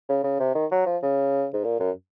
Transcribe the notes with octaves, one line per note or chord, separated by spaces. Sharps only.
C#3
C#3
C3
D#3
F#3
F3
C#3
G#2
A#2
F#2